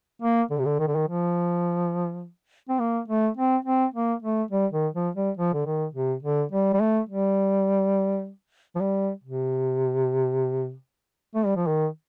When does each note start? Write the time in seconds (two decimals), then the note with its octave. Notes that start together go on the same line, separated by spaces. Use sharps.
0.22 A#3
0.50 D3
0.58 C3
0.65 D3
0.79 D#3
0.87 D3
0.96 D#3
1.08 F3
2.69 C4
2.79 A#3
3.08 A3
3.37 C4
3.65 C4
3.94 A#3
4.23 A3
4.51 G3
4.72 D#3
4.94 F3
5.15 G3
5.37 F3
5.54 D3
5.66 D#3
5.94 C3
6.23 D3
6.52 G3
6.73 G3
6.80 A3
7.09 G3
8.75 F3
8.80 G3
9.24 C3
11.35 A3
11.45 G3
11.56 F3
11.67 D#3